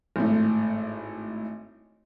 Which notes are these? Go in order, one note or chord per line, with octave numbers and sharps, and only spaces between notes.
G#1 A2